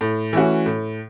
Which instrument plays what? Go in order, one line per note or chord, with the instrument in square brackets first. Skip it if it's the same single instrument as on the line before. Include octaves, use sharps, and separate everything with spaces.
[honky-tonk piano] A2
E3 A3 C#4 F#4
A2